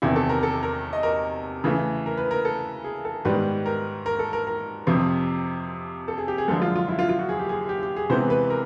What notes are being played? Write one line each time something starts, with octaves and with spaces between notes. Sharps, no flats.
E2 C3 D#3 E4
A4
A#4
A4
A#4
D#5
A#4
C#3 E3 A3
A#4
B4
A#4
A4
G#4
A4
G#2 D#3 G3 B3 B4
A#4
A#4
A4
A#4
A#4
F2 C3 F3
A4
G#4
G4
G#4
F#2 D3 F3 G#3 A4
F4
F4
E4
F4
F4
F#4
G#4
G4
G#4
G4
G4
G#4
C3 E3 G#3 B3 C5
B4
A#4